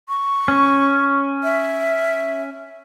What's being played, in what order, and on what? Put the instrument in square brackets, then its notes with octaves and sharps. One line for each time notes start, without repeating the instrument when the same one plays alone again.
[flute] C#6
[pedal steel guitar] C#4
[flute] E5